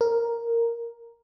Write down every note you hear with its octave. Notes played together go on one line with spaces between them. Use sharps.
A#4